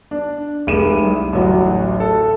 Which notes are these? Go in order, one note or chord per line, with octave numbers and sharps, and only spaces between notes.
D4
F1 G#3 D#7 E7
C2
A1 D2 F#3 F#4
A4